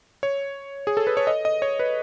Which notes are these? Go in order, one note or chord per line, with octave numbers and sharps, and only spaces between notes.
C#5
G#4
A4
B4
C#5
D#5
D#5
C#5
B4